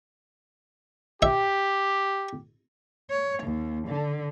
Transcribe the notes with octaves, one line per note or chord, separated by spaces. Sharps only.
G4 E5
C#5
D#2
D3